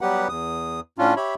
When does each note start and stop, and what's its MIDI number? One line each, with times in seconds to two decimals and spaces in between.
0.01 0.28 54
0.01 0.28 55
0.01 0.28 59
0.01 0.28 67
0.01 0.28 71
0.01 0.28 78
0.29 0.80 40
0.29 0.80 87
0.98 1.14 45
0.98 1.14 61
0.98 1.14 62
0.98 1.14 65
1.16 1.35 67
1.16 1.35 73
1.16 1.35 76
1.16 1.35 83